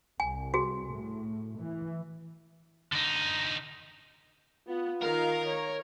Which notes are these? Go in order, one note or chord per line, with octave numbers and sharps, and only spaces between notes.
C2 G#5
F#4 G#4
A2
E3
D3 D#4
B3 F4
D#3 A#4 F5 A#5
C#5